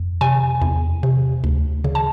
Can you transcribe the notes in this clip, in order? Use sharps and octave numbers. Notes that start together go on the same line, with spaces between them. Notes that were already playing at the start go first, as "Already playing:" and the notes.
Already playing: F2
C3 G#5
E2
C3
D2
C#3
A5